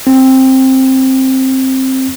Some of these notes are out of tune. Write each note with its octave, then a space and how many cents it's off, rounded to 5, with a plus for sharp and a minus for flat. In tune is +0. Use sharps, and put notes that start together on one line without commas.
C4 +10